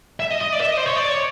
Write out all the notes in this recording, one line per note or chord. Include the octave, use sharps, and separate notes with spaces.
E5
D#5
D#5
D5
E5
D#5
C5
C#5
D5
C#5